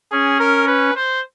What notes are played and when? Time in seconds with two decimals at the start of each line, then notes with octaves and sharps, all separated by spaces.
0.11 C#4 G#4
0.39 A#4
0.68 B4
0.96 C5